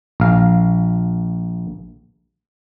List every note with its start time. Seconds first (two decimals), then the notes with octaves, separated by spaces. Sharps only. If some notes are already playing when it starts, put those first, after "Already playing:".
0.20 A#1 F5